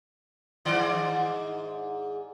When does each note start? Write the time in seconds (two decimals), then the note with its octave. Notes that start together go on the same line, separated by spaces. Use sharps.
0.65 G#2 D#3 D5